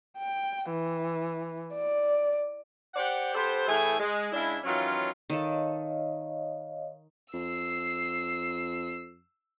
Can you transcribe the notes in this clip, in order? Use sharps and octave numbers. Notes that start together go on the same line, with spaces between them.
G5
E3
D5
G4 C5 D5 F#5
B3 G4 A4 C5
A2 E3 A3 G#4 G5 G#5
G#3
C#3 G#3 D4 E4
D#3 E3 F#3 C#4 F4
D#3 A4 C#5 D#5 F5
F2 E6 C7